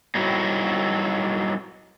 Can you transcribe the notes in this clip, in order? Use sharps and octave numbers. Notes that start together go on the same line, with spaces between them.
F#3 G3 C4 D#4 E4 F#4